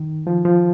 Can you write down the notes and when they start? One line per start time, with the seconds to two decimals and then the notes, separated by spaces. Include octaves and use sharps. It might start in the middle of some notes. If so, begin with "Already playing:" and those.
Already playing: D#3
0.27 F3
0.45 F3